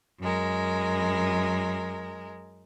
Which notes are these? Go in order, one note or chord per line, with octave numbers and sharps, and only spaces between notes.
F#2 G#3 A#4